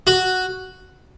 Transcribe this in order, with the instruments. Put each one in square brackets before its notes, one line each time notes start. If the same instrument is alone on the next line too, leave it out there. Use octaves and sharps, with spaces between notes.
[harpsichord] F#4